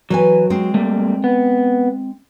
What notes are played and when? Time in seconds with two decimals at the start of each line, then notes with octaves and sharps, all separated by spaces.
0.10 E3 F#3 B4 G#5
0.50 G#3 C4
0.74 G3 A3 A#3
1.24 B3